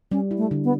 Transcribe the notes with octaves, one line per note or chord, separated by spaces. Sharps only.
G3 C#4
E4
A3
D3
B3